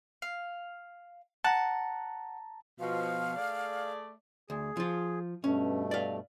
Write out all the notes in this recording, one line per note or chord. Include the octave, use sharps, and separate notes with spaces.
F5
F#5 A5 A#5
B2 F3 F5
A3 G#4 D5
D2 G#4
F3 F4
G2 B2 A3 C#4
D5 F5